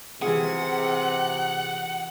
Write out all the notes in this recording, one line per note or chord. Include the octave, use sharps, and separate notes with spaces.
C3 E3 F4 G#4 F#5